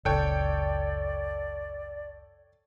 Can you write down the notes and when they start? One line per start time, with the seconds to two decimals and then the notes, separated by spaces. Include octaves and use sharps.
0.05 F#1 C#2 A4 C#5 D5 G5